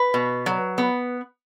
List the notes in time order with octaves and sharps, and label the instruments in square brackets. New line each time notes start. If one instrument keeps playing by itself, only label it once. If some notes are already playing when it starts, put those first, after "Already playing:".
Already playing: [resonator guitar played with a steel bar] B4
B2
F#3
B3